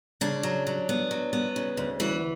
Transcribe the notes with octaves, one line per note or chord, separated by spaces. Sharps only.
C#3 D4
F#3
F#3
B3
F#3
B3
C#3
D2
E3 F#4